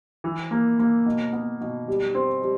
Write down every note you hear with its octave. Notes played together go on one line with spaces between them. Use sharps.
E3
A#3
A#3
B2
B3
B2
G3
C4
G3